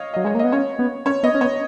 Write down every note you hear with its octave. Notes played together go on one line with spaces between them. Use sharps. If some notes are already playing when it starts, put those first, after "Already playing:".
Already playing: C#5 D#5 F5
F#3 D#5
G#3 C#5
A#3
D#5
B3
C#4 C#5
B3
C#4 C#5
B3 D#5
C#4
B3 C#5